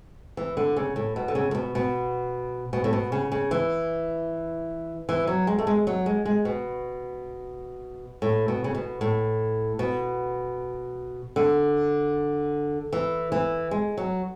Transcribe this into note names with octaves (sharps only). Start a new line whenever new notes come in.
E3
D3
C#3
A2
B2
D3
C#3
A2
B2
B2
B2
A2
B2
C#3
C#3
E3
E3
F#3
G#3
A3
G#3
F#3
G#3
G#3
B2
A2
B2
C#3
B2
A2
B2
D3
E3
E3
G#3
F#3